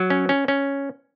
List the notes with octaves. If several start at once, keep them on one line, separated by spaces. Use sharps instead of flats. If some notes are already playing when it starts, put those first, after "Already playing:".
Already playing: F#3
C#4
C#4
C#4